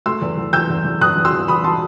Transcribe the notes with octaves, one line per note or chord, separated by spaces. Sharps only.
A3 C6 E6
E2
E2
E2 E6 G6
E2
E2
E2 D#6 F#6
E2
C6 E6
E2
E2 B5 D#6
B2 A5 C6